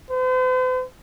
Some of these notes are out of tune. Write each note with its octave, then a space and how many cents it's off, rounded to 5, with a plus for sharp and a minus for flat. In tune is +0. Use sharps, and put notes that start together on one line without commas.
C5 -45